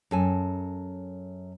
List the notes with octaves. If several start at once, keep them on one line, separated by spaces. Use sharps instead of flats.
F#2 A4 G#5